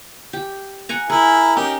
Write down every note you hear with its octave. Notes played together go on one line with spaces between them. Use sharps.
G4
F#5 G#5 A#5
E4 G#4 A#4
C#4 D#4 G4 A#4